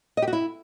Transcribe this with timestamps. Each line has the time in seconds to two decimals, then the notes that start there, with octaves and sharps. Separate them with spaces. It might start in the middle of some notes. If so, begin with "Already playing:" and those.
0.17 D#5
0.22 G4
0.28 F#4
0.33 E4